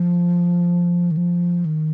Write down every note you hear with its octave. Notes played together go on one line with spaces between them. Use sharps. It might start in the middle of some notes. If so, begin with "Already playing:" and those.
Already playing: F3
D#3
F3
D#3